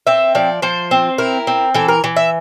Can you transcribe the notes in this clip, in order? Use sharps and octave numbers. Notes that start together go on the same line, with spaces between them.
C4 E5
F3 D5
F3 C5
C4
E4 A#4
C4
E3 A4
A#4
E3
E5